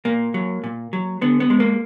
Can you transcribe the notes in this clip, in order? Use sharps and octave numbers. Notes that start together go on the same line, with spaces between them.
A#2 A#3
F#3
A#2
F#3
D3 B3
B3
G#3
A#3